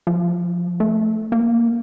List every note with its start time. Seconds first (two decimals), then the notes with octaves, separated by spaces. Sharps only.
0.07 F3
0.80 A3
1.32 A#3